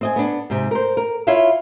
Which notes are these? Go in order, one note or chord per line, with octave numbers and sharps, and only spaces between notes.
C4 D#5 G#5
B3 D4
G#2 C3
A#4 C5
A#4
E4 F4 C#5 E5 F5